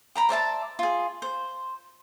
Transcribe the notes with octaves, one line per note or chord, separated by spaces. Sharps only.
G5 A#5 B5
C5 D5 E5 A5
F4 G#4
C5